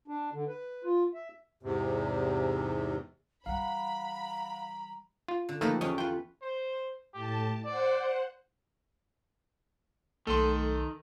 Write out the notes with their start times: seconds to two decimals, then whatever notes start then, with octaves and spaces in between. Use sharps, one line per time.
0.08 D4
0.33 D3
0.48 B4
0.84 F4
1.14 E5
1.63 E2 G#2 C3
3.46 E3 G3 F5 F#5 A#5 B5
5.28 F4
5.49 D3
5.61 D#3 F3 A3 A#3 G4 A4 B4
5.81 E2 C#4 D5 D#5
5.98 A3 F4 B4 G5
6.42 C5
7.14 A2 G4 A5
7.65 C5 D5 F#5
10.27 B1 D#3 A3 A4 C6